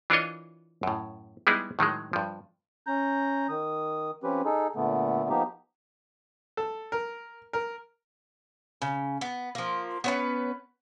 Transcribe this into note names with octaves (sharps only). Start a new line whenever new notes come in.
E3 D4 F4 A#4 C#5 D#5
F#2 A2
G3 G#3 B3 D#4 E4 G#4
A2 D#3 F#3 G#3
G2 F3
C#4 A#5 G6
D#3 D#6
F3 C4 C#4 G4 B4
D#4 G#4 A4
A#2 D3 A3 B3
F3 A#3 B3 D#4 G4
A4
A#4
A#4
C#3
B3
F3 A#3
B3 C#4 B4